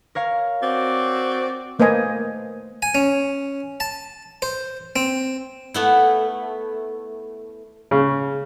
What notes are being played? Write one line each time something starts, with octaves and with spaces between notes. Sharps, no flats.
A#4 C#5 F5
C4 F#4 D5
A3 A#3 B4 C5 D#5 G#5
G#5
C#4
A5
C5
C4
A3 B3 E4
C#3